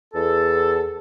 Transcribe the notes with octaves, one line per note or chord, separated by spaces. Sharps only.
E2 A4